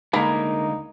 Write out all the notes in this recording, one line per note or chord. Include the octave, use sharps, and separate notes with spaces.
D2 D3 G#3 A#3 D#4 B5